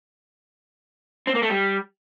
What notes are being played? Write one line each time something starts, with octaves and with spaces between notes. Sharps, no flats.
C4
A#3
A3
G3